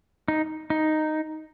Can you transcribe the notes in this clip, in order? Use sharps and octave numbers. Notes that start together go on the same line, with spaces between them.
D#4
D#4